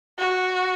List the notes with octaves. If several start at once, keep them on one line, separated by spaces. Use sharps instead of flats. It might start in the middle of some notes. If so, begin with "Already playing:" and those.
F#4